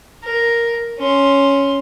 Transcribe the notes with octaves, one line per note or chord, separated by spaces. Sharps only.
A#4
C#4 C6